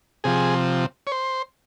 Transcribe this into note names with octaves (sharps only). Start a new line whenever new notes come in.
C3 F3 G#4
C#5
C5